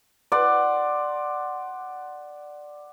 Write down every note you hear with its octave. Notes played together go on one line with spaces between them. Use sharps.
D5 F#5 C6